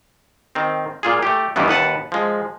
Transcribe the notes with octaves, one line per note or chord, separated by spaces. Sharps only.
D#3 C4
A#2 F4 G#4
A3 G4
G2 D#3 E3 G3 B3
D#2 B4 F#5 A5
F3 G#3